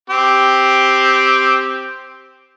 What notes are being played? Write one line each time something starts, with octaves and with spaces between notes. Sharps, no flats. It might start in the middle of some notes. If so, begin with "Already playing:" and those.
C4 G4